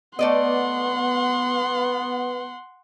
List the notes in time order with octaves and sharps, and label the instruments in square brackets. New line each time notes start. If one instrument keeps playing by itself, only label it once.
[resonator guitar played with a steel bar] A3 D5 D#5 [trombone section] B3 [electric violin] F#5 C6